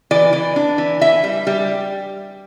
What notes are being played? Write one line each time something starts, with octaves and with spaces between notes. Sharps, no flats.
E3 D5
E3
D4
E3
E3 E5
G3
G3